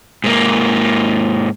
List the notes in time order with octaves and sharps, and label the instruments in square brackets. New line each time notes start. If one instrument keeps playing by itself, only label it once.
[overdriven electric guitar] G#2 A#3